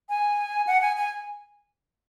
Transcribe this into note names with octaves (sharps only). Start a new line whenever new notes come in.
G#5
F#5
G#5
G#5